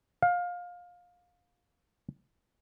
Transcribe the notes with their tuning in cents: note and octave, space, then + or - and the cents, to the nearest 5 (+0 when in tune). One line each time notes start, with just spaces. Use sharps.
F5 +25